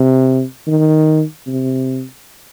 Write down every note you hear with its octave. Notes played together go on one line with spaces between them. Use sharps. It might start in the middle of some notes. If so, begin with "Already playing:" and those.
Already playing: C3
D#3
C3